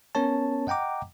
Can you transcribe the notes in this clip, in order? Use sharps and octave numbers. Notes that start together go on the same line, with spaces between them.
B3 C#4 A#4 C#5 A5
D#5 F#5 G5 A#5 D6